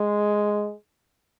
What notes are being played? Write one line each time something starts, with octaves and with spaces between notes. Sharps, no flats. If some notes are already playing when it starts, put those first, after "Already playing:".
Already playing: G#3